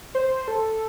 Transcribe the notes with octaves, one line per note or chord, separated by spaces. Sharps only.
C5
A4